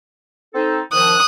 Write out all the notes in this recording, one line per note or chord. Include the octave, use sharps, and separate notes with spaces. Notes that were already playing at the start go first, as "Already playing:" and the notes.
C4 D#4 A4
D#3 F3 D#6 F#6